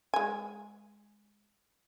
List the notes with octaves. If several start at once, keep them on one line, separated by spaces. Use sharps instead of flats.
G#3 G#5